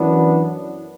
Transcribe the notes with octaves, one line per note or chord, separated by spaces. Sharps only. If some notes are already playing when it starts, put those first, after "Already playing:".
Already playing: F#2 E3 B3 D4